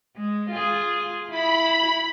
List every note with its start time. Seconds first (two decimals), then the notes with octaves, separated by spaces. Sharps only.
0.16 G#3
0.50 F4 G#4
1.31 E4 B5